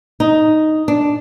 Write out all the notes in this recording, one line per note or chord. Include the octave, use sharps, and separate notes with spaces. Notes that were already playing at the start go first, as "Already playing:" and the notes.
D#4
D4